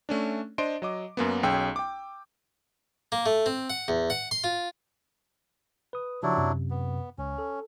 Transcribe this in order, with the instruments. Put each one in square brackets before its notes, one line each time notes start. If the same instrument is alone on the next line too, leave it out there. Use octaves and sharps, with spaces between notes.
[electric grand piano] A3 C#4 D4
D4 C5 D#5 C6 D7
F#3 D#5 D6
F#2 A#3 B3
B1 C#4 G#4 G5 E6
G5 D6
[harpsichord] A#3
A3
C4
F#5
E2
F#5
C6
F4
[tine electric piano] B4 D#6
[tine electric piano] C#3 F3 G4 [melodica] F#3 D4 E4
[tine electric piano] F#2 C3
[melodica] B3
[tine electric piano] C#2 [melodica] C#4
[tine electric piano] A4